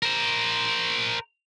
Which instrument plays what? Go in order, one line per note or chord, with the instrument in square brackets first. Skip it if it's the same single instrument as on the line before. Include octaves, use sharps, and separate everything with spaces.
[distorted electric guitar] A#4 C5